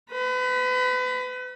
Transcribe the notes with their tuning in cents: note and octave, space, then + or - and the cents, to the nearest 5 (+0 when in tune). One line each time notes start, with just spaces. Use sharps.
B4 +35 B5 -25